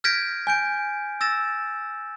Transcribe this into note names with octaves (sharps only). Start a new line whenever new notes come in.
F6 G6 G#6 A#6 B6 D7
G#5 G6 D7
E6 A6 A#6 E7